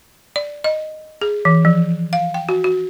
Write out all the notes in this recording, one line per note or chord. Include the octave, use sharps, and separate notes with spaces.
D5
D#5
G#4
E3
F3
F5
G5
F#4
F#4